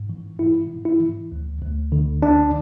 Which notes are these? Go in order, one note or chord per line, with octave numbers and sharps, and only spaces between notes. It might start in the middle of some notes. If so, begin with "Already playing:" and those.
Already playing: G#2
E3
G#2 E4
G#2
E4
E3
D2
D2
D3
D2 D4